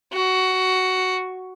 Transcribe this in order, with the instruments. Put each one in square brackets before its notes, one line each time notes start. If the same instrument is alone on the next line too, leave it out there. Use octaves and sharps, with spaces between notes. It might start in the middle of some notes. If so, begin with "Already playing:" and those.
[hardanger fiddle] F#4